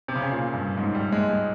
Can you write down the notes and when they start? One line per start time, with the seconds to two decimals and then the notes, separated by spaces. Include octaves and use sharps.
0.08 C3
0.16 C#3
0.22 C3
0.31 A#2
0.54 G2
0.78 G#2
0.95 G3
1.12 G#3
1.29 G#3